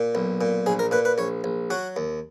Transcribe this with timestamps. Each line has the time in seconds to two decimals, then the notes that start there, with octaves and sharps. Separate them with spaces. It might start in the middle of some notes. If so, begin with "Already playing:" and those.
Already playing: A#2
0.15 B1
0.41 A#2
0.66 A#1 G#4
0.79 A#4
0.91 A#2 B4
1.05 B4
1.18 A#1 C#5
1.44 A#1
1.70 F#3 F#4
1.96 D#2